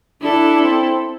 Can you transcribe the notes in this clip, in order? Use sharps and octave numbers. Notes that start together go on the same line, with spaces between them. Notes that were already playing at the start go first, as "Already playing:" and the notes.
D4 E4 A4
C4